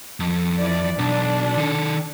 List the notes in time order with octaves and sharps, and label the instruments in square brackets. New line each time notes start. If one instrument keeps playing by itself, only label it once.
[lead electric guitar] F2
[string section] E3 D5
[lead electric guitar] B1 [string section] D4
[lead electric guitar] D#3 A4